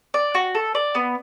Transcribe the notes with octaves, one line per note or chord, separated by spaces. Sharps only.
D5
F#4
A4
D5
B3